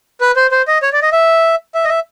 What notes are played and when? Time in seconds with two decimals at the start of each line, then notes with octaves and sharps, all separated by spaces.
0.21 B4
0.36 C5
0.51 C5
0.67 D#5
0.82 C#5
0.93 D5
1.02 D#5
1.12 E5
1.75 E5
1.85 D#5
1.89 E5